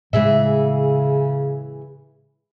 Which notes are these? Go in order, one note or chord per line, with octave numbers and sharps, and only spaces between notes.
A2 C#3 E3 G#3 G#4 E5